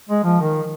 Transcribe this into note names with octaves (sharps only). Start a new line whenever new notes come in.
G#3
F3
D#3